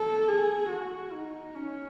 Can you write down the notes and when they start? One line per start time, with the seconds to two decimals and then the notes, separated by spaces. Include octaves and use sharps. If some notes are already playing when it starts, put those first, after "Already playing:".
Already playing: A4
0.28 G#4
0.70 F#4
1.13 D#4
1.55 C#4